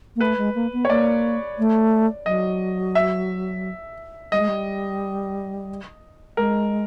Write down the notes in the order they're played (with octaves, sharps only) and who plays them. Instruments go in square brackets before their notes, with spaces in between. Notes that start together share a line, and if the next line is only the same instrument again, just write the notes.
[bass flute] A#3
[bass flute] A3 [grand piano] B4
[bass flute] G#3
A#3
B3
[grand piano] C#5
[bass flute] A#3 [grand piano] D5
[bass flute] A3
[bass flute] F#3 [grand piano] D#5
[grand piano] E5
[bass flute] G3 [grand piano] D#5
[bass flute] G#3
G3
[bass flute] G#3 [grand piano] A#4